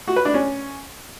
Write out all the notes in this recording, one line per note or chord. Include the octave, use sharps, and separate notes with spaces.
F#4
B4
D4
C#4